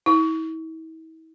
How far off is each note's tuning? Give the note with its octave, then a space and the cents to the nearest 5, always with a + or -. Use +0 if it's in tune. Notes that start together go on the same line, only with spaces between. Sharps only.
E4 -40